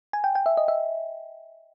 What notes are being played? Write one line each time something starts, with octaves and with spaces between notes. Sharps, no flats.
G#5
G5
G5
E5
D#5
E5